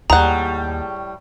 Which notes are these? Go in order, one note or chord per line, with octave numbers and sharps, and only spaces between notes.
D#2 A2 G3 G#4 F#5 A#5